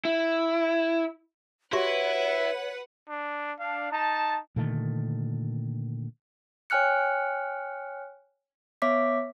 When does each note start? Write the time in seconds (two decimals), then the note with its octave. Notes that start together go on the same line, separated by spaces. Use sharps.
0.05 E4
1.73 E4 F#4 G4 B4 C#5 E5 F#5
3.09 D4
3.60 D4 F5
3.92 D#4 A5
4.56 A#2 D3 D#3 A3
6.70 C#5 G5 G#5 F6 F#6 C#7
8.82 B3 C#5 E5 D6 B6